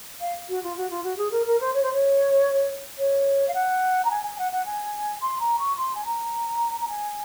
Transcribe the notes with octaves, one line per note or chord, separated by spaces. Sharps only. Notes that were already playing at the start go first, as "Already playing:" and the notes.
F5
F#4
F4
F#4
F4
F#4
G#4
A#4
A#4
C5
C#5
C5
C#5
C#5
F5
F#5
A#5
G#5
G#5
F#5
F#5
G#5
C6
A#5
C#6
C6
G#5
A#5
A#5
G#5